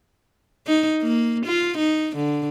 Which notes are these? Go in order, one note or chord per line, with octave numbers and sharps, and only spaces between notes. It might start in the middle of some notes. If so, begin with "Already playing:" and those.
D#4
A#3
F4
D#4
D3